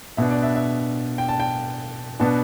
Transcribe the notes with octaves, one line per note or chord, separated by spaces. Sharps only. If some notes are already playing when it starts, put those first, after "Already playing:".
B2 B3 D4 E5
D5
E5
E5
G5
A5
G5
B2 B3 D4 A5